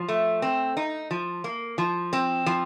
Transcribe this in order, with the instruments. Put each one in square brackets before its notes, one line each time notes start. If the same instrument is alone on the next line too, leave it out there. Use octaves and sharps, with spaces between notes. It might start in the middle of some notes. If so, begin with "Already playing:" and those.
Already playing: [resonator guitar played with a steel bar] F3
A3
C4
D#4
F3
A#3
F3
C4
F3